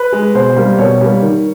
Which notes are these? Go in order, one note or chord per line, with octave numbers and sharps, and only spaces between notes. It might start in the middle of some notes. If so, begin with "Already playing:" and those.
Already playing: B4
G#3
B2 C5
G3 A#3
B2 C#5
G3 A#3
D#3